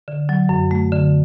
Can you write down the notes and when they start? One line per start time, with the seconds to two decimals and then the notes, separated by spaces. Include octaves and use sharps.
0.08 D3
0.29 F#3
0.49 F#2
0.71 A3
0.92 D3